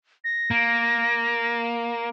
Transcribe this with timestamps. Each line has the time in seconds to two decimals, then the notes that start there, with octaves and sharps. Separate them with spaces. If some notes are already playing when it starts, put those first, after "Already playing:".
0.24 A#6
0.51 A#3